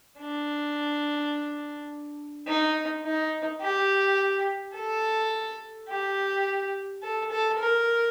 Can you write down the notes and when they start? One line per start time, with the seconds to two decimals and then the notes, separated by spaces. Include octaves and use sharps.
0.20 D4
2.47 D#4
3.04 D#4
3.61 G4
4.74 A4
5.89 G4
7.03 A4
7.31 A4
7.59 A#4